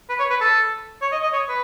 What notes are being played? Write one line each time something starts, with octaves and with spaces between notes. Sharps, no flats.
B4
C#5
B4
A4
C#5
D#5
D#5
C#5
B4